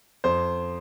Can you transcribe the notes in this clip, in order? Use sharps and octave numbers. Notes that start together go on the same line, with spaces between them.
F2 C5